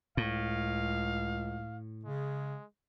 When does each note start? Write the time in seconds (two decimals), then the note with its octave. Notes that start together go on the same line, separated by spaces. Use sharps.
0.17 C#2 A2 F5
2.05 C#3 G#3